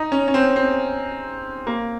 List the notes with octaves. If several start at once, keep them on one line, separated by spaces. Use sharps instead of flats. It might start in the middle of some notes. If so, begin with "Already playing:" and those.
Already playing: D#4
C#4
C#4
C4
C4
A#3